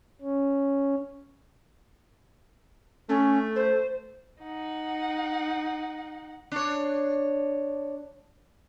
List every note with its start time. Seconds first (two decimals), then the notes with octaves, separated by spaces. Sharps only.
0.21 C#4
3.09 A3 C#4
3.56 C5
4.43 D#4 F#5
6.52 D4 C#5